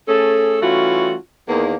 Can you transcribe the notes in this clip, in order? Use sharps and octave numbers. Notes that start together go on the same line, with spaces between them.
A3 C#4 G#4 A4
E3 G3 A3 C#4 F4 F#4
E2 D#3 A#3